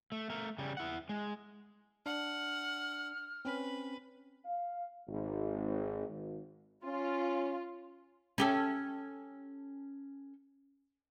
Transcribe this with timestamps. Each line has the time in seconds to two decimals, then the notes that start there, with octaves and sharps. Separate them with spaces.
0.12 A3
0.30 A3 A#4
0.58 C#3 G3
0.77 E4 F#5
1.09 G#3
2.06 D4 F#5 F6
3.45 C4 C#4 B4
4.45 F5
5.08 G#1
6.08 G#1
6.84 C#4 F4
8.38 C#4 G4 A4